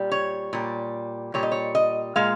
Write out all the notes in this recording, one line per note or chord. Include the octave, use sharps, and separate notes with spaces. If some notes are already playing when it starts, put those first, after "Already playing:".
Already playing: A#2 G3
C#5
A#2 G3
A#2 G3 C#5
D#5
C#5
D#5
A#2 G#3 F5